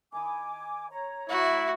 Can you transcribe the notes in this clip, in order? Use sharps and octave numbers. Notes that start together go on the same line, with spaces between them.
D#3 D#4 G#5 B5 D6
C#5 A#5
A2 E3 F#3 E4 F#4